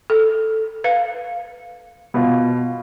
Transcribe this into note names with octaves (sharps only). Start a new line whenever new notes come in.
A4
B4 F5
B2 F4